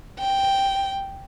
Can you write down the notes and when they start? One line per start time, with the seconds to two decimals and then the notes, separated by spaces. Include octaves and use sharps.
0.19 G5